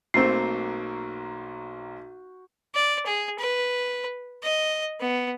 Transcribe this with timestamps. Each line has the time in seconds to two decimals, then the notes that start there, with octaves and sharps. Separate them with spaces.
0.14 B1 A3 A#3 C4 F#4 C5 C7
2.75 D5
3.06 G#4
3.39 B4
4.43 D#5
5.00 B3